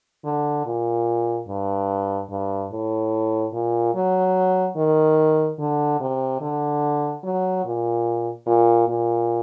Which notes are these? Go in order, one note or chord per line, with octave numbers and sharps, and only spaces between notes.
D3
A#2
G2
G2
A2
A#2
F#3
D#3
D3
C3
D3
F#3
A#2
A#2
A#2